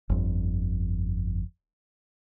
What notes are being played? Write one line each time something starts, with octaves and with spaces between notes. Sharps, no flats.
G1 F2